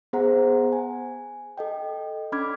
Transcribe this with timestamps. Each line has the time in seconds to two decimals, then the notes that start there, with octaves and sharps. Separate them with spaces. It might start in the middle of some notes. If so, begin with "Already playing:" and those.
0.13 B3 G#4 C5 F#5 A#5
0.72 G#5
1.58 A4 D#5 G5
2.32 C#4 D4 B5 D6 F6 G#6